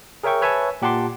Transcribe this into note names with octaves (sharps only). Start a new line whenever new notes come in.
G#4 A#4 C#5 E5 G5 C#6
B4 C#5 E5 G#5 A5 C#6
A#2 G4 F#5 A5 C6 D6